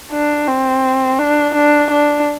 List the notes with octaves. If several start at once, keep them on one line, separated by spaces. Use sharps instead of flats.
D4
C4
D4
D4
D4